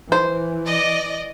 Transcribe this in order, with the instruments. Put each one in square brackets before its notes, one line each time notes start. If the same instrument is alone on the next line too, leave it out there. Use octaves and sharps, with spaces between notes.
[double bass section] E3 [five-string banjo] C5
[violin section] D5 D#5